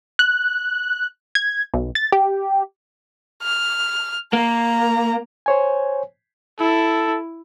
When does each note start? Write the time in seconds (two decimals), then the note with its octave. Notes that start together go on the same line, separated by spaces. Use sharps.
0.19 F#6
1.35 G#6
1.74 B1
1.95 A6
2.12 G4
3.43 F6
4.33 A#3 A#5
5.46 C5 C#5 G#5
6.60 E4 A4